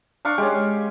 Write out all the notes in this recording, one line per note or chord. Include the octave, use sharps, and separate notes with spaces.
D4 F5 C#6
G#3 C#4 G4